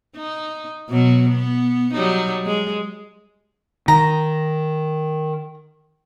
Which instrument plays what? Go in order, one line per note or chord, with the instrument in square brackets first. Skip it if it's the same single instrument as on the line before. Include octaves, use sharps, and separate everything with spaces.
[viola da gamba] D#4
B2 F#3
B3
F#3 G3 D#4
G#3
[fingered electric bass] D#3 [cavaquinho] A#5